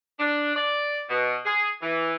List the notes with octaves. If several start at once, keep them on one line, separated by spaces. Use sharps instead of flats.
D4
D5
B2
G#4
E3